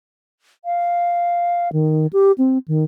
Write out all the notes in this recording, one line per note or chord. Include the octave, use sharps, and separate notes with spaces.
F5
D#3
G4
C4
D#3